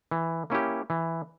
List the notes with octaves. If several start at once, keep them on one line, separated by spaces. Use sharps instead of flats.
E3
A#3 C#4 E4 G4
E3